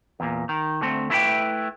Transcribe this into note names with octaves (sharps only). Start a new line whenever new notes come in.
E2 A#2
D#3
D2 A3 C4
A3 E4 B4 C5 G5